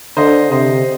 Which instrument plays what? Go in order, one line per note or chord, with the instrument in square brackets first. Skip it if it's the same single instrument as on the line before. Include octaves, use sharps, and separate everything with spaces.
[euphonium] D3 [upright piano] C5 D#5
[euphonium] C3 [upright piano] C5 D#5